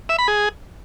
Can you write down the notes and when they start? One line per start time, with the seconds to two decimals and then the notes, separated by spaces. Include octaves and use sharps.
0.09 E5
0.19 B5
0.28 G#4